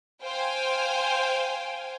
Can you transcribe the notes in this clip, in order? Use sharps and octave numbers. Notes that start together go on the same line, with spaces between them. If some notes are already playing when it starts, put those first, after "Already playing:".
C5 F5 G5 G#5